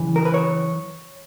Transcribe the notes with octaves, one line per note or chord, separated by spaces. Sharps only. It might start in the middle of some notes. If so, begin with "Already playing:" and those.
Already playing: F#2 C#3 E3
A#4
B4
C#5